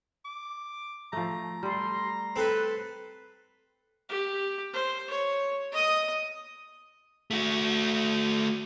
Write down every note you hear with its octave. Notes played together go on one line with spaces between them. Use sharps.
D6
F3 A3 A#5
G3 A4 C6
C4 A4 B4 C6
G4
C5
C#5
D#5 D#6
A3 F#4